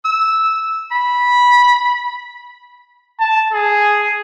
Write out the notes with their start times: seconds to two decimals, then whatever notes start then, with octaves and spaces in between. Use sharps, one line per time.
0.05 E6
0.91 B5
3.20 A5
3.53 G#4